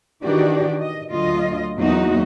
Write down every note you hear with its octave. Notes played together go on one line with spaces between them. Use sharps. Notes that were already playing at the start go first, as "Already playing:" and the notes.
D#3 E3 D4 F#4 G4 D5
D#5
D2 F#3 F4 D#5
E2 F#3 A#3 D#4 F#4